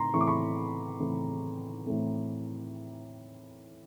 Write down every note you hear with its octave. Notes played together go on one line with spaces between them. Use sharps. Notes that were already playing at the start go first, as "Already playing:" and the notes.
Already playing: A2 C4 A#5 C6
A2 E3 A3 C4 C#6
D6
B5 C#6
A2 E3 A3 C4
A2 E3 A3 C4